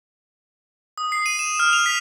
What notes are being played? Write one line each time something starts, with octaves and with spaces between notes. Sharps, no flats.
D#6
C7
D#7
E7
F6
F7
B6